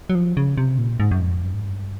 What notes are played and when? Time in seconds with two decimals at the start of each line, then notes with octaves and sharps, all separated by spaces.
0.10 F#3
0.15 F3
0.37 C#3
0.57 C3
0.78 A#2
1.00 G#2
1.11 F#2
1.21 F2
1.43 F#2
1.54 G#2
1.65 G2